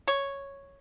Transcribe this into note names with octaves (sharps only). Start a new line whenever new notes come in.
C#5